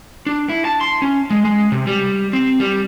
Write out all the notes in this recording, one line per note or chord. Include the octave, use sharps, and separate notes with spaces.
D4
E4
A5
C6
C#4
G#3
G#3
C3
G3
C4
G3